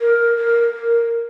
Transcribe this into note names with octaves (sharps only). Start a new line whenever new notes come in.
A#4
A#4
A#4